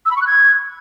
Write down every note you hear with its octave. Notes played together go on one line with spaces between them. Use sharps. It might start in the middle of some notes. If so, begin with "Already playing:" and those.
E6
B5
C#6
F#6
G#6